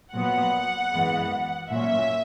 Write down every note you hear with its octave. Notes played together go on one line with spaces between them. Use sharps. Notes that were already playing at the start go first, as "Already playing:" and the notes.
A#2 F#3 B3 F#5
F#2 E3 G#3 B3
A#2 F#3 C#4 E5